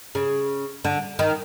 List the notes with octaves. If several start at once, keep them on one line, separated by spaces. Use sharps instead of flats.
C#3
D3
D#3